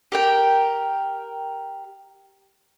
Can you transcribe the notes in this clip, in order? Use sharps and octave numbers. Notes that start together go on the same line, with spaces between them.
G4 A#4 G5